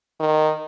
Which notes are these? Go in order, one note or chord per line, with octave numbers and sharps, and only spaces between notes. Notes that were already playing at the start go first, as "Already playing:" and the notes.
D#3